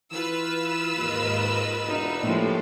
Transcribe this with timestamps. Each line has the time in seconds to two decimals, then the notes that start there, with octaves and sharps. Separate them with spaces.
0.12 E3 F4 B4 E6
0.97 D#2 G#2 A#4 D#5
1.87 E1 D4 D#4
2.23 A2 F3 G#3 A#3 G4 A4